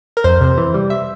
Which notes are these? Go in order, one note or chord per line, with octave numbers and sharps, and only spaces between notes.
A#4
F2 C5
C3
E3
G3
E5